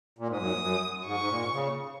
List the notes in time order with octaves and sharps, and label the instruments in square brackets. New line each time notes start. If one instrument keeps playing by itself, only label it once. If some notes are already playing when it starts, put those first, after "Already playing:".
[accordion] A#2
G#2
[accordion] F#2 [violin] D#6
[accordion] F#2
[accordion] G#2 [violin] C#6
[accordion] G#2
A#2
C#3